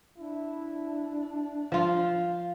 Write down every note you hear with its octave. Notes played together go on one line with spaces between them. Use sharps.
D4 E4
F3 F4 F5